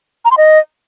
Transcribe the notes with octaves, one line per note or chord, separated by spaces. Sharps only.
A#5
C6
D#5